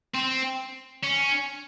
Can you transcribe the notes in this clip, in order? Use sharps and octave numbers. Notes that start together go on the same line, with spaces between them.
C4
C#4